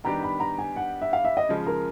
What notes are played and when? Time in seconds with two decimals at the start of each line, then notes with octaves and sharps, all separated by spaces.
0.04 D#3 G3 B3 D4 G4 A#5
0.23 B5
0.40 A#5
0.59 G#5
0.76 F#5
1.01 E5
1.13 F5
1.25 E5
1.37 D#5
1.49 C#3 F3 G#3
1.67 A#4